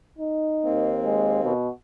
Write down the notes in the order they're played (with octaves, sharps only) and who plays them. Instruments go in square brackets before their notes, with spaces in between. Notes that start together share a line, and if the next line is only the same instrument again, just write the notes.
[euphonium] D#4
[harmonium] D#2 A#3 C4
[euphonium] G#3
B2